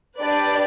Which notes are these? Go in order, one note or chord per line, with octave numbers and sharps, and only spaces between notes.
D4 G4 B4 D5